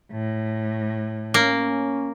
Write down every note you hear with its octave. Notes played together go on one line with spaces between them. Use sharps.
A2
A#3 C#4